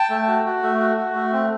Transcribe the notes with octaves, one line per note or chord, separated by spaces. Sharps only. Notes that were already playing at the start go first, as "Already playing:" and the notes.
Already playing: G5 A5
A3
F#4
F#4
A3
F#4
F#4
A3
C4